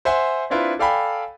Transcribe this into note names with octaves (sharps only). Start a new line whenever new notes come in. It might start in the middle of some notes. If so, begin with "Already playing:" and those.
C5 E5 F#5 G#5 C6
C4 D4 E4 F4 B4
A4 D5 F5 G5 G#5 B5